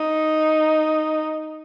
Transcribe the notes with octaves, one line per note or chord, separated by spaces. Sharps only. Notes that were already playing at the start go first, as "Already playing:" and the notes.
Already playing: D#4